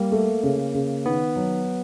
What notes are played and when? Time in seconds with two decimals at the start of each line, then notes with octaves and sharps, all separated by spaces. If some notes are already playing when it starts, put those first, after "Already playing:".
Already playing: G3 A#3
0.12 A3
0.43 C#3
0.74 C#3
1.06 D#3 B3
1.36 F#3